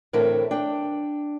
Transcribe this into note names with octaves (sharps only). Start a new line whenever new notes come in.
A2 D3 E3 C4 A#4 E5
D4 G5